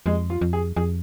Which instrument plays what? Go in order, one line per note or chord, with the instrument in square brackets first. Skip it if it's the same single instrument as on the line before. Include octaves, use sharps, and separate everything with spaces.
[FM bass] F2 [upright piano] G#3
[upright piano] F4
[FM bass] F2
[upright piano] G#4
[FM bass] F2 [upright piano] G#4